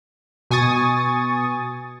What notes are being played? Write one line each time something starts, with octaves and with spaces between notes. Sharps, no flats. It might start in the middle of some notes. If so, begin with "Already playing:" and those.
B2 G#5 C#6 D#6 A6